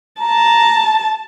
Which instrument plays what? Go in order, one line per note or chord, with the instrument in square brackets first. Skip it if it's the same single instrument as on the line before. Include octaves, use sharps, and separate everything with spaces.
[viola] A5 [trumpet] A#5